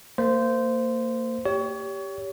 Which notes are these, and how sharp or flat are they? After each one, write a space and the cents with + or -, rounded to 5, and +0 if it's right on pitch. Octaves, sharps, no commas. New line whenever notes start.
A#3 -30 C5 -15
G4 +0 C#5 +30